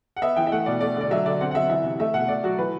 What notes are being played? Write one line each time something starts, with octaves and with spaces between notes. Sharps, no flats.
F#5
B3 E5
E3 G5
E5
A3 F#5
B2 D5
A3 D5
D3 D5
F#3 E5
D3 D5
C4 F#5
F#5
F#3 E5
E3 E5
C3
A3 E5
B2 F#5
A3 D5
F#3 F#4
E3 B4